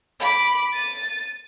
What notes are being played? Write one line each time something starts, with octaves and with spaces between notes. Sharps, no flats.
B5 D6
A6 D#7